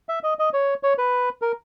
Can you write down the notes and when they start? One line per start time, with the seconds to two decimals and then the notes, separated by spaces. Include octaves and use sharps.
0.09 E5
0.23 D#5
0.39 D#5
0.53 C#5
0.83 C#5
0.98 B4
1.42 A#4